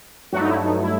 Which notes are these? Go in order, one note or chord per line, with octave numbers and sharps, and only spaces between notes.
G2 F#3 A3 F#4
D#4
E4
D#4
E4